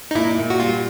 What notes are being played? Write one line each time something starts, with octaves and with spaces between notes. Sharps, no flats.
D#4
A#2 E4
A#2
F#4
G3 F4